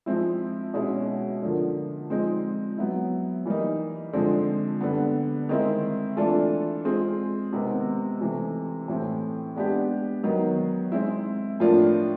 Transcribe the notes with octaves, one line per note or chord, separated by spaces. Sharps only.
F3 G#3 C4 E4
B2 G#3 C#4 E4 G#4
D3 F3 A#3
F3 G#3 C4 D#4
F#3 B3 E4
E3 G3 A#3 D#4
D3 F3 G#3 C4
D3 G3 B3
D#3 G#3 C4 E4
E3 A3 D4 F4 A4
G#3 C4 F4 G#4
C3 D#3 G#3 B3
C3 E3 A3
A2 E3 A3 C4
G#3 B3 D4 G4
D#3 F#3 B3
G#3 C4 E4
A2 F3 A#3 D4 F4